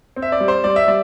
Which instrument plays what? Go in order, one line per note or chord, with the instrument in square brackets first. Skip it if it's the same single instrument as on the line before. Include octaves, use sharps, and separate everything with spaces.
[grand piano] C4
E5
D5
G3
C5
G3 D5
E5
G3 D5